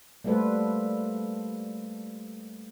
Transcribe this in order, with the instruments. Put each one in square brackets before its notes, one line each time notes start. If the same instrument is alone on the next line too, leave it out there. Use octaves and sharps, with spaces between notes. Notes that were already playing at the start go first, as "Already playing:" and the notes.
[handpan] G3 A3 A#3 A4 B4 C5